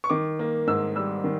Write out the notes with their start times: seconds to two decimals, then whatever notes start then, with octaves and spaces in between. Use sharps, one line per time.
0.04 C#6
0.10 D#3 D6
0.39 A#3
0.67 G#2 E6
0.96 G3 E6
1.24 D#3